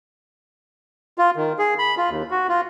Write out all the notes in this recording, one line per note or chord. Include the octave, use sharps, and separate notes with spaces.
F4
D#3
G#4
B5
F4
D#2
F#4
F4